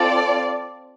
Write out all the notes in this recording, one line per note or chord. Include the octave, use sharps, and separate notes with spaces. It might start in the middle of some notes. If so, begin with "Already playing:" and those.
Already playing: C4 F4 A4 D5